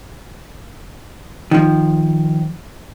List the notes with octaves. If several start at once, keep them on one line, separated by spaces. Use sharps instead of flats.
D#3 F3